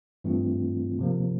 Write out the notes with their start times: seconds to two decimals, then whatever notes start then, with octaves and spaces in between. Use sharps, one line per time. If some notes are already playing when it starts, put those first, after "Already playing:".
0.24 G2 E3 A3 C4 F4
0.99 C3 F3 A#3